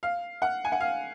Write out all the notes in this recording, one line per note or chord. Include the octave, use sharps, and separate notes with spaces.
F5
F#5
G#5
F#5
F5